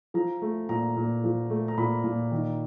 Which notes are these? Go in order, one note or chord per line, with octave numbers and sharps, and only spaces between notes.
F3 A#5
A3
A#2 A#5
A#2
F3
A3
A#5
A#2 B5
A#2
D#3